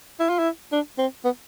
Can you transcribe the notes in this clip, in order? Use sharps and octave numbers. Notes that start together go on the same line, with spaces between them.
E4
F4
E4
D4
C4
B3